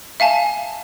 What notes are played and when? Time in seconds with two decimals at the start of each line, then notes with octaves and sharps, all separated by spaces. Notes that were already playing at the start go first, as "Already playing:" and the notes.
0.20 E5 F5 G#5 A5